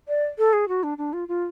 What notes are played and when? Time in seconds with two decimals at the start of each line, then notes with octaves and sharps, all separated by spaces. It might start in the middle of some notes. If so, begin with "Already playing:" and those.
0.08 D5
0.38 A4
0.53 G#4
0.68 F#4
0.83 D4
0.98 D4
1.13 F4
1.28 F4